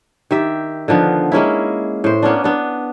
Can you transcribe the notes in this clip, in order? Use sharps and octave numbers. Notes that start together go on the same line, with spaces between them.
D#3 G4 E5
D3 D#3 F3 B3
G#3 A#3 C#4 E4
A2 C5
A#3 B3 C#4 D4
B3 D4